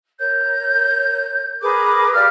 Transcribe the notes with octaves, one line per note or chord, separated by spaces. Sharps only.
A#4 C#5 G6
G#4 A#4 B4 D6
G4 D5 F5 F6